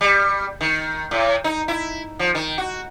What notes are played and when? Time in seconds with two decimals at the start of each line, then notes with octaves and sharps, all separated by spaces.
0.01 G3
0.61 D#3
1.11 A2
1.44 D#4
1.68 E4
2.19 F3
2.35 D#3
2.58 F#4